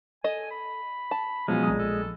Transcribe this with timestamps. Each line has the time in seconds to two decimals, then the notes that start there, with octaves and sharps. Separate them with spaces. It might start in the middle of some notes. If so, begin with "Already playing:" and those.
0.24 A4 D#5 G#5
0.51 B5
1.11 A5
1.48 B2 F3 F#3 G#3 C#4
1.63 A#1 D#6
1.79 A4